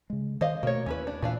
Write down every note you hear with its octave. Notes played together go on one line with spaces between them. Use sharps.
C#3 G#3
D#3 C5 D#5 F5
B2 A3 A#3 C#5
D#2 C#4 E4 B4
D4
A#2 E3 D4 F5